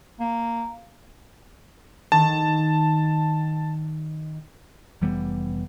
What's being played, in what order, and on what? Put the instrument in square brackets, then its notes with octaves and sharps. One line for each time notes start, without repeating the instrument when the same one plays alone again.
[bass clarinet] A#3
[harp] D#3 [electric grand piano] A5
[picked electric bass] F1 E3 G3 B3